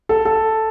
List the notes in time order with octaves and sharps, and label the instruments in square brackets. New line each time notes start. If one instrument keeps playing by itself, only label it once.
[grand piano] A4
A4